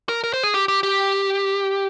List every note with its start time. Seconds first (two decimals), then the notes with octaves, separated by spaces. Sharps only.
0.09 A#4
0.24 A#4
0.33 C5
0.43 G#4
0.54 G4
0.68 G4
0.83 G4